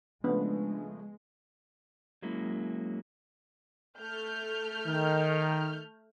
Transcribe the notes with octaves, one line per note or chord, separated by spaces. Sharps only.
C#3 F3 G#3 A3 B3 D4
F#3 G#3 A#3 C#4 E4
A3 F6 G6
D#3